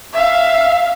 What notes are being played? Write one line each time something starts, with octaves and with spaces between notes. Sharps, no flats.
E5 F5